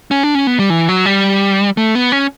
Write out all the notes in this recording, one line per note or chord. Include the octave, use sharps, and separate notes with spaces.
C#4
D4
C#4
B3
G3
E3
F#3
G3
A3
B3
C#4